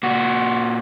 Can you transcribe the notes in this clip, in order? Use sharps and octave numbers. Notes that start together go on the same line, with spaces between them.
A#2 F#4